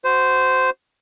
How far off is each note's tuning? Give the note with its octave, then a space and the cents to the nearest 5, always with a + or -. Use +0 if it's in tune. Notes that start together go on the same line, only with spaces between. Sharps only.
F#4 +5 C5 -10